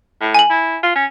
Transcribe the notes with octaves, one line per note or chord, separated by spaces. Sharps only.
A2
G#5 F#7
E4
F4
C#4